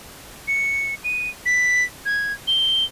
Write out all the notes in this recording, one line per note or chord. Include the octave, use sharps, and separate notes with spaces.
C#7
D#7
B6
G#6
G7